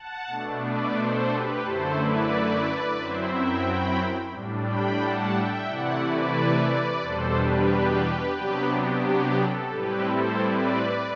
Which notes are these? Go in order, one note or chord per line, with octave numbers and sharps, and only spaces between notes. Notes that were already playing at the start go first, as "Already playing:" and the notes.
Already playing: F#5 A5
B2 A3 D4
B4 D5
A4 C5
G4 B4
F#2 D3 A3 E4 A4 C5
B4 D5
F#2 F#3 C4 E4 C5 E5
E5 G5
G5 B5
A2 G3 D4
G5 B5
F#5 A5
E5 G5
C3 E3 A3 E4 D5 F#5
B4 D5
B4 D5
E2 B2 G3 D4 A4 C5
G4 B4
C3 F#3 B3 D4 G4 B4
G4
G4
A4
A2 G3 C4 E4 G4 B4
A4 C5
B4 D5